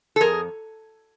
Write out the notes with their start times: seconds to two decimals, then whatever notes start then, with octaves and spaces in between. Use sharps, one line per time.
0.16 A4
0.21 F2 G#4 A#4